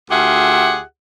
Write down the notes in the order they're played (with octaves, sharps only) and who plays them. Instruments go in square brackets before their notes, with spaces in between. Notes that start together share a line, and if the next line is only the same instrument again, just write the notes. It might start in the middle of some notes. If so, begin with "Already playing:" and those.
[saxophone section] D2 F4 G4 G#4 E5 F#5